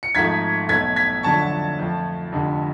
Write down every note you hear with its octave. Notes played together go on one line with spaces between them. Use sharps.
C#7
G#1 G#2 F3 A3 G#6 B6
B1 B2 A3 G#6 B6
G#6 B6
F2 D3 F#3 A3 D4 A5 C#6
F2 F3 A3
F1 F2 D3